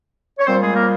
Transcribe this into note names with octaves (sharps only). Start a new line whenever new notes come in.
C#5
A#2 G3 C4 C5
G#3 G#4
A#3 A#4